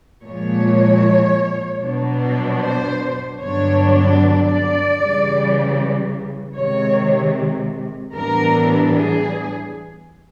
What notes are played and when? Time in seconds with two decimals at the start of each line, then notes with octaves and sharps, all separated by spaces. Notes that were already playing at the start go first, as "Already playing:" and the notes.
0.24 A#2 F3 G#3 C#5
1.82 B2 F#3 B3 D4
2.61 C5
3.40 G2 D3 F#3 B3 D4 C#5
4.20 D5
4.98 C#3 E3 G3
6.56 C3 D#3 G#3 C#5
8.14 A2 E3 G3 B3 D4 A#4
8.93 G#4